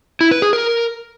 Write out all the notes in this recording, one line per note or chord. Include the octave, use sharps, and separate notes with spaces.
E4
B4
G#4
A#4